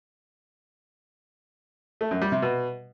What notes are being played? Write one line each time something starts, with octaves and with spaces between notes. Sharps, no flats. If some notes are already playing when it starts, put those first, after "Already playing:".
A3
F#2
G3
C3
B2